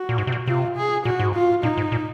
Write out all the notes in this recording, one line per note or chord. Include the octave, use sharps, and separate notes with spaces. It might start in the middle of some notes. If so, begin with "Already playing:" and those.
Already playing: F#4
A#2
G#2
C3
A#2
C3 F4
G#4
A#2 F#4
G#2
F4
A#2 D#4
G#2
A#2